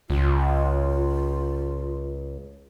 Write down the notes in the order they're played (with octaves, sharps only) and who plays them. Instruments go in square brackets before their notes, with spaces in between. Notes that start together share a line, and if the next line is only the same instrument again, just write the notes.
[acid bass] C#2 [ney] F4